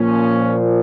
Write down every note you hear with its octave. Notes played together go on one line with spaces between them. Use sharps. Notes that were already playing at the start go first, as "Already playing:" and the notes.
Already playing: A#2 F3 C#4